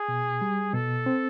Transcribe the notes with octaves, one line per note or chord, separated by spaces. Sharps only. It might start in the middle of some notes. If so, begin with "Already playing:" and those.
Already playing: G#4
B2
G3
B2 A4
C4